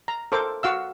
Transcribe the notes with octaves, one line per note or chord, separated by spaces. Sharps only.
A#5
A4 A#4 C5 D6
F#4 F5 E6